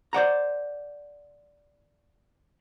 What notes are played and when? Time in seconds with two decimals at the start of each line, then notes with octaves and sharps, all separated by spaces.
0.13 C5 D5 F#5 A#5